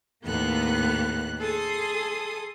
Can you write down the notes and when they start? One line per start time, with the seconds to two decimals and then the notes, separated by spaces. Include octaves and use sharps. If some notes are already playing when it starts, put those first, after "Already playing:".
0.23 D#2 A2 A#3 B3 A4 F#6
1.39 G#4 A4 C6 D#6